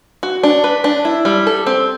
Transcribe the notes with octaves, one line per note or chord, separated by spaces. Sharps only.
F#4
D4
B4
D4
E4
G3
A4
C4